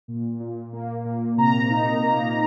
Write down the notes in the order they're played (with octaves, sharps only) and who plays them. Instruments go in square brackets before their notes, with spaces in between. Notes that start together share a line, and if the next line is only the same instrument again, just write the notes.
[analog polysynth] A#2
A#2
A#3
A#2
C3 A#5
D#4
A#3